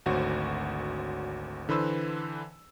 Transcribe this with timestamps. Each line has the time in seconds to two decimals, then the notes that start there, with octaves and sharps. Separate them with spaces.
0.06 G#1 D2 F#4 C5 C#5
1.69 D3 E3 B4 C5 E6